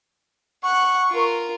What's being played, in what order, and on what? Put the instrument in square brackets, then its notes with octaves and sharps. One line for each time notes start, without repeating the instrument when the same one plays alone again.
[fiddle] F#5 F#6 [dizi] C#6
[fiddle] F4 A#4